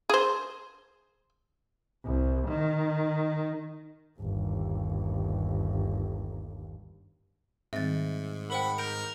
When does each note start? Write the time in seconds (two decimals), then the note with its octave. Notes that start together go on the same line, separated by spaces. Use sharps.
0.10 G#4 C5
2.05 C2
2.48 D#3
4.20 G1 D#2
7.73 G#2 D#3 G3 C4 E5 A6
8.50 A#4 C5 F#5 G5 B5
8.78 A#4 G6 D7 F7